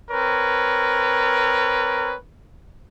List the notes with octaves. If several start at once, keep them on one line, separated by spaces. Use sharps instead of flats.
C4 A#4 B4 C#5